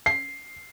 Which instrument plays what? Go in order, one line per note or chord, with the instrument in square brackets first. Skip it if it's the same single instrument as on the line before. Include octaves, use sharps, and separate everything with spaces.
[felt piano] C7